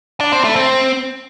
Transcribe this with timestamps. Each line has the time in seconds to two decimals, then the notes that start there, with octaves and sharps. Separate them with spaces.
0.20 D4
0.32 C4
0.44 A3
0.56 C4